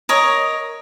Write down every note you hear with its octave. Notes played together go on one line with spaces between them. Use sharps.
A#4 C#5 D#5